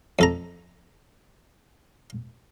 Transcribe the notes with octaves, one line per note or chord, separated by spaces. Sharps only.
F2 A4 A#5